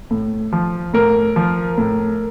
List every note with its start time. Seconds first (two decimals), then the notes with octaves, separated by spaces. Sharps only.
0.11 A2
0.53 F3
0.94 A2 A#4
1.36 F3
1.78 A2